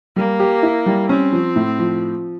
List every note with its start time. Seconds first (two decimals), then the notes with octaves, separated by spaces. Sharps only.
0.16 G3 A#3
0.40 G4
0.63 E4
0.86 G3
1.09 C4 C#4
1.32 F3
1.56 A2
1.79 F3